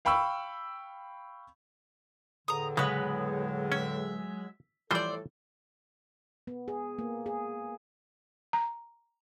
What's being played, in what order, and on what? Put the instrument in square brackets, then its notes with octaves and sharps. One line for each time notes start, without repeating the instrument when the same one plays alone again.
[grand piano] F5 G5 B5 C#6 E6
[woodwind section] E2 A2 D3 [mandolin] A#5 D#6
[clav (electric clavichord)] C#3 [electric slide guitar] F#3 G#3 [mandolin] B3 B4
[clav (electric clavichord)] C#4 [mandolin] E5
[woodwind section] A2 A4 [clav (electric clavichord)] E3 F3 G3 [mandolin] C5 D5
[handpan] B3
G#4
A#3
G#4
[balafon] A#5